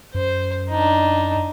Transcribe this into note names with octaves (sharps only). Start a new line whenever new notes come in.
F#2 C5
D4 D#4